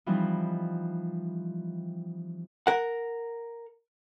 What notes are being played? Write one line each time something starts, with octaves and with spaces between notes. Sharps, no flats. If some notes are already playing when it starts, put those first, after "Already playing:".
E3 F3 G3 C4 D#4
A#4 F#5